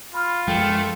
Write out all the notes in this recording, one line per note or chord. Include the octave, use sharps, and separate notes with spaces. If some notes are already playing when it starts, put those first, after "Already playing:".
F4 B5 F6
F#2 F3 G#3 A3 G5